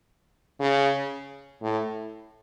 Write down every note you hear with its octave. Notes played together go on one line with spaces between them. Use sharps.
C#3
A2